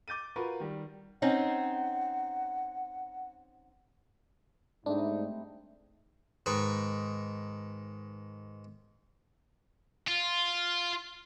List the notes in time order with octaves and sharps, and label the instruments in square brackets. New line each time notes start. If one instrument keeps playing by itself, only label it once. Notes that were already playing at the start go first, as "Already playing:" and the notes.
[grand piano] D6 G6 A6 D#7
F4 F#4 A#4 B4 C#6
D#3 G3
[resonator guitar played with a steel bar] C4 C#4 D#4 [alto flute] F#5
[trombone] G#2 [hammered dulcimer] G3 A3 C4 [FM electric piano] D4 [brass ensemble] D#4
[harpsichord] G#2 D#3 B4 C#6
[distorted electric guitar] F4